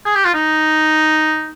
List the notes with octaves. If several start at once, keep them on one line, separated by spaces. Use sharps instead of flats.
G#4
G4
F4
D#4